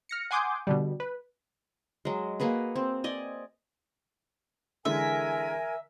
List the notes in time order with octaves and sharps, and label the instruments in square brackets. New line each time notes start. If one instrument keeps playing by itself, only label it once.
[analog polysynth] F6 A#6 C#7
F#5 G#5 C6 D6 D#6 G6
B2 D3 G3
B4
[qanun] F#3 G#3
A#3 F#4 G#4 B4
C4
D5 D#5 G#5
[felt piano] D3 E3 G#3 [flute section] A#4 G#5 [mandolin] E5